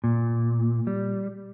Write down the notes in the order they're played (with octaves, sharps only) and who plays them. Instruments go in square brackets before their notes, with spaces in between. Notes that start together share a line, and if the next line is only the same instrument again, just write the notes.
[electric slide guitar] A#2
G3